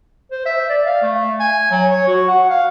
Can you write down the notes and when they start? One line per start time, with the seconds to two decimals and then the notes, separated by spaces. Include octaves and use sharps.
0.31 C5
0.46 E5
0.69 D5
0.86 F5
1.02 A3
1.40 G#5
1.71 F#3
1.90 C#5
2.08 F#4
2.28 F#5
2.50 F5